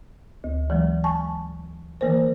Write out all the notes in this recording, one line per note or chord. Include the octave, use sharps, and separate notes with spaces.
D2
E3 F#3 G#3
G#5 A5 C#6
D#3 E3 A#3 A#4 C5